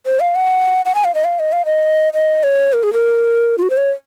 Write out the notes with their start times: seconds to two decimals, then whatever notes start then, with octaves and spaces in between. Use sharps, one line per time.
0.06 C5
0.20 F5
0.35 F#5
0.85 F#5
0.95 G#5
1.04 F5
1.15 D#5
1.24 F5
1.39 D#5
1.52 F5
1.65 D#5
2.14 D#5
2.43 C#5
2.73 A#4
2.83 G#4
2.93 A#4
3.58 F4
3.62 F#4
3.70 C5
3.77 C#5